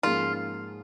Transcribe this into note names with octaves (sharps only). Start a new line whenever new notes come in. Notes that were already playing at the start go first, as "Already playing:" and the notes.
G#2 F3 A#3 C#4 F4 G#4